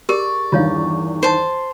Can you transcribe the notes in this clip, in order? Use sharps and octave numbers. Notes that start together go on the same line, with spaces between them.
G4 G#4 A#4 D5 C#6
E2 G2 D#3 F4 C#5 F5
C5 A5